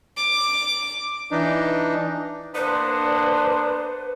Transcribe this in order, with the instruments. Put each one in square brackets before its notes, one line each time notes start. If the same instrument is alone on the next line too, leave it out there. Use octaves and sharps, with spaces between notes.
[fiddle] D6
[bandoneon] E3 D4 D#4
[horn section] A#3 B3 D4 [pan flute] B4 [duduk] C5